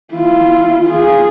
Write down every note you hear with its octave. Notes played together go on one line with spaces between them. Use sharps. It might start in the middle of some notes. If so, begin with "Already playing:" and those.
E4 F4
F4 G#4